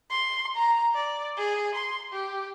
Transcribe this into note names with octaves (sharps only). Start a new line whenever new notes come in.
C6
A#5
D5
G#4
C6
G4